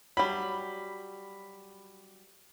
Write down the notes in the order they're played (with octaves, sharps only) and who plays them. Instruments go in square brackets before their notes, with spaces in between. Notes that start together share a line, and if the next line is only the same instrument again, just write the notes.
[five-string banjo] F#3 G3 [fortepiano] B5